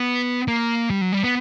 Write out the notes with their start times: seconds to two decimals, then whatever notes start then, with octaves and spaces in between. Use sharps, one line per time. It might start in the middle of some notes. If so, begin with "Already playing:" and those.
Already playing: B3
0.48 A#3
0.90 G3
1.01 F#3
1.13 G3
1.23 B3